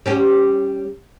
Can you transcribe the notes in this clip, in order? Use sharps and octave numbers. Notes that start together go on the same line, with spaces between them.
G3 C#4 G4